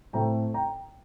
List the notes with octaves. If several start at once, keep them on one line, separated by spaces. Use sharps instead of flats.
A2 A3 C4 G5 A#5
G5 A#5